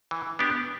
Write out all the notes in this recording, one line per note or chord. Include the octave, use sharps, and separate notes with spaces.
E3
B3 D4 G4